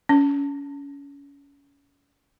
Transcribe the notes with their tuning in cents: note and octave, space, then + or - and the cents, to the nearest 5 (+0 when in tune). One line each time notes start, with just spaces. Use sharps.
C#4 +25